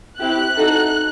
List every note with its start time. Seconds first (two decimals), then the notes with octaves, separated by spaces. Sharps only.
0.19 C4 E4 G4 F#6
0.57 D#4 F#4 A4